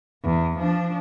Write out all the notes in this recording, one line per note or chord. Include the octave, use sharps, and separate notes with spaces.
E2
F3 D4